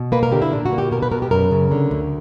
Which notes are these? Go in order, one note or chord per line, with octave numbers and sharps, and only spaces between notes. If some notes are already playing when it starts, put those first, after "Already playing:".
Already playing: B2
A#3 B4
A#4
D3 G4
E4
A#2 D4
F#4
A#3
G4
B2 A#4
B4
B2 A#4
G4
F#2 A#4
C#3
D3
D2